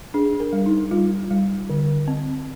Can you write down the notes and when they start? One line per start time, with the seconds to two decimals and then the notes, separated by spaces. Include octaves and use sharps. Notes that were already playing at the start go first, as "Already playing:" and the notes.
0.14 D4 G#4
0.40 A#4
0.53 G3
0.66 D#4
0.91 G3 F4
1.30 G3
1.70 D3
2.08 C4